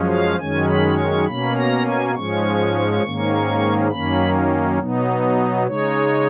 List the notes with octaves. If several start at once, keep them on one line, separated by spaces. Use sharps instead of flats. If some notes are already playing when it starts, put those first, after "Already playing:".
Already playing: F#2 F3 G#3 C#4
F5
F#2 D#3 G#3 C#4 G#5
B5
C#6
B2 A#3 C#4 B5
A#5
G#5
G#2 F3 G#3 C#4 C#6
G#2 D#3 A#3 C#4
F#2 D#3 A#3 C#4 B5
B2 F#3 B3 D#4
C#3 G#3 D#4 C#5